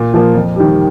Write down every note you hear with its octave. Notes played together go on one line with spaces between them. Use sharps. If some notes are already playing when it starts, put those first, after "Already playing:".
Already playing: A#2
F3 A#3
F2
D#3 G3